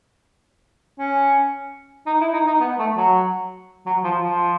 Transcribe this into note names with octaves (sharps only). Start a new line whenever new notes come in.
C#4
D#4
E4
D#4
D#4
B3
A3
F#3
F#3
F3
F3